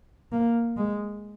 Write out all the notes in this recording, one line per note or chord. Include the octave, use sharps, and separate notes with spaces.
A#3
G#3